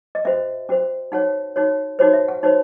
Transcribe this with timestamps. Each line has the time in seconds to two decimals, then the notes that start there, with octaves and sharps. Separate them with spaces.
0.15 D#5
0.25 C#4 F#4 C5 E5
0.69 C#4 F#4 C5
1.12 D#4 F#4 C#5 F#5
1.56 D#4 F#4 C#5
1.99 D#4 F#4 C5 C#5
2.13 E5
2.28 F#5
2.43 D#4 F#4 C5 C#5